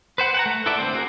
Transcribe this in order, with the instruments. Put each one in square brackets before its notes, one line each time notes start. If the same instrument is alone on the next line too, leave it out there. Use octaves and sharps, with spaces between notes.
[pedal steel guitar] B4 C5 F#5
F#5 G5 A#5
A3
E4 A4 B4 D5 E5
D3 A#3 C4 C5
C4 F#4 G#4 A#4